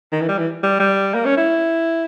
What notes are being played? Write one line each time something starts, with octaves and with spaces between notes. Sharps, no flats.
D#3
E3
G3
E3
G3
G3
A#3
C#4
E4